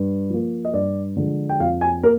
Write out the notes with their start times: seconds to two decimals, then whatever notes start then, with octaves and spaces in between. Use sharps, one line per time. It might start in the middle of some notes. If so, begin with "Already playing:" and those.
Already playing: G2
0.30 F3 A#3
0.65 D#5
0.73 G2 D5
1.17 D3 F3 G#3
1.49 G5
1.60 F2 F5
1.81 G#5
2.03 A#3 A#4